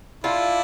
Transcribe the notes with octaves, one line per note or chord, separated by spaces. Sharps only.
D4 E4 F4